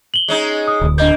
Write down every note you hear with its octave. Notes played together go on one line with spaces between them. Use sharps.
F#7 G7
G#3 C#4 D#4
D#6
D1 D2
A#3 D4 D#5 G6